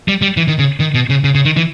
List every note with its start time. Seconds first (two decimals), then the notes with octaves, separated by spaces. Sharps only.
0.08 G3
0.22 G3
0.37 E3
0.48 D#3
0.59 C#3
0.80 D#3
0.94 B2
1.10 C#3
1.24 C#3
1.35 C#3
1.45 D#3
1.57 E3